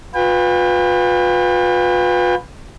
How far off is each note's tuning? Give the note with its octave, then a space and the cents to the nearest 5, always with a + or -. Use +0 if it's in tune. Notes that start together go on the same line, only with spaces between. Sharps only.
F4 +40 B4 +0 G5 +40